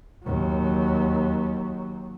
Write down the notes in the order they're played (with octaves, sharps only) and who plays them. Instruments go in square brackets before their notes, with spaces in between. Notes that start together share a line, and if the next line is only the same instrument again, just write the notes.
[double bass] D#2 F#3